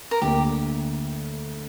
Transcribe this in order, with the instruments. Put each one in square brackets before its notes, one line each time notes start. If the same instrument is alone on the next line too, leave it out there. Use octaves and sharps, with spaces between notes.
[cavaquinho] A#4
[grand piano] D2 D3 A#3 [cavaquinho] G4